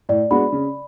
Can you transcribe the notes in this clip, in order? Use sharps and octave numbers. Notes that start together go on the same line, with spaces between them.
A2 D5
G#3 B3 D4 F#4 B5
C#3